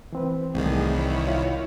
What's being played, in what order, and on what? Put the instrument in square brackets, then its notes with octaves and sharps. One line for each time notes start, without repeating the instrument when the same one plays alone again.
[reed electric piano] E3 C4 B4
[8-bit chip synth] C2 D#3 [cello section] A2 G#4
[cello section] E4 C#5
[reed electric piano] F4